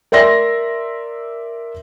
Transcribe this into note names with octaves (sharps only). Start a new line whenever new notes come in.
A#4 D5 E5 C6 A#6